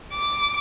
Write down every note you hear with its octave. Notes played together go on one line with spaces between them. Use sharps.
D6